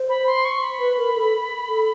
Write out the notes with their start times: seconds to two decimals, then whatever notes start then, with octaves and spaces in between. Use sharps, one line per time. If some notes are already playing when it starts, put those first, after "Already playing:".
Already playing: C5
0.09 B5
0.27 C6
0.45 C#6
0.62 B5
0.80 B4
0.98 A#4
1.16 A4
1.69 A4